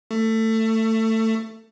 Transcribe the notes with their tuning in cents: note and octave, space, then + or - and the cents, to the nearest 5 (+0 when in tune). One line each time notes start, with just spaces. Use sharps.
A3 +20